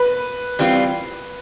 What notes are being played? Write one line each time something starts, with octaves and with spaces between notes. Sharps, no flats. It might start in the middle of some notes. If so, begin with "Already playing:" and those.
Already playing: B4
E3 G3 C4 F4